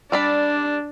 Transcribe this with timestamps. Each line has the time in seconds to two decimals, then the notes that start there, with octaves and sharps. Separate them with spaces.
0.12 G3 D4 D5 B5